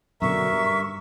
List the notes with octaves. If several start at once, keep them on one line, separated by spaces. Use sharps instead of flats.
F#2 B2 D3 A#4 E5 C#6
G2